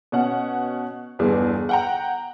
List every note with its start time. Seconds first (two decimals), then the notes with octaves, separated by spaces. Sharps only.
0.12 B2 C#4 F#5
1.19 G1 E2 G#4
1.69 F#5 G5 A#5